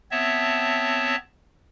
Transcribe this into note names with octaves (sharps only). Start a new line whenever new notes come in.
B3 C4 C#5 E5 A5